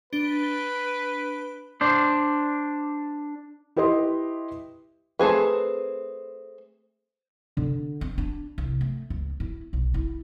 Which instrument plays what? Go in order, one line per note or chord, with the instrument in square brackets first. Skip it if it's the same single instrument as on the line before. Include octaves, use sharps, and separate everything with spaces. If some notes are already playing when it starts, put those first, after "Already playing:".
[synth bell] D4 D7 G7 [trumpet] B4
[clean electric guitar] D4 C5
[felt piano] E4 G4 B4 D#5 C6
[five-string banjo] A3 C4 G#4 B4
[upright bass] D3
C4
D4
C2
A3
C#2
E4
B1
E4